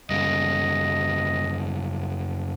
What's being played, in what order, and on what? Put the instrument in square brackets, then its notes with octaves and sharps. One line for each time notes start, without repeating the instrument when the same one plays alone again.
[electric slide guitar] F#2 C#3 G3 [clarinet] D#5